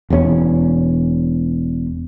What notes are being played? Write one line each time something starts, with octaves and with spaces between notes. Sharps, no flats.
E1 E2 F#3 C#4